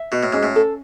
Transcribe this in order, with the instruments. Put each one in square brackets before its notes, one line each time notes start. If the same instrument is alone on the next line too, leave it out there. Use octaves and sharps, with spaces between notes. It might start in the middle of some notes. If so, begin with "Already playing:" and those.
Already playing: [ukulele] E5
[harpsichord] B2 [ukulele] F#4
[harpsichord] A2
[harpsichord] G#2 [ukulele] C#4
[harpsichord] A2
[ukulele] A4